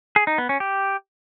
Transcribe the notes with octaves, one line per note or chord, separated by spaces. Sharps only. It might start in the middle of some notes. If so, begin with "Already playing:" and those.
G#4
D#4
B3
C#4
G4